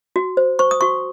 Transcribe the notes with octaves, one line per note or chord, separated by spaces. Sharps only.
F#4
C5
C5 C#6
D#6
F#4 C#6